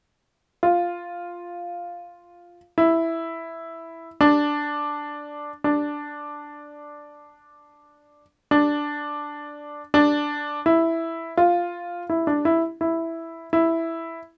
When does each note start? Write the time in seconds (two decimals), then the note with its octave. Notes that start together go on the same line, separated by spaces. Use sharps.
0.63 F4
2.78 E4
4.21 D4
5.64 D4
8.51 D4
9.94 D4
10.66 E4
11.37 F4
12.10 E4
12.27 D4
12.45 E4
12.81 E4
13.53 E4